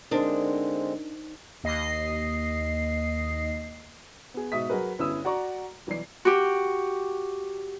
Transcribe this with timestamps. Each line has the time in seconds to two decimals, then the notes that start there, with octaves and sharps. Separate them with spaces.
0.11 D3 G#3 C4 D4 D#4 A#4 C5
1.64 D#2 D#5 C7
4.34 B3 G#4
4.52 G#2 B2 E5 D#6 B6
4.70 F#3 F#4 G#4 A#4 B4
4.99 G1 C#4 E4 D#6 E6
5.25 F#4 D5 A#5 C#6
5.87 B1 E3 F#3 D5 C7
6.25 F#4 G4